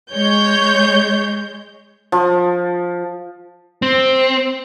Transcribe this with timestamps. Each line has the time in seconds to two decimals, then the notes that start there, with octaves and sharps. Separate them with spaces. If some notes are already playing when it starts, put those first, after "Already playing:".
0.12 G#3 C#5 G6
2.12 F3
3.82 C4